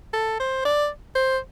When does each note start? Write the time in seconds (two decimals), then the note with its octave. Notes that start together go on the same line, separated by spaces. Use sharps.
0.13 A4
0.40 C5
0.65 D5
1.15 C5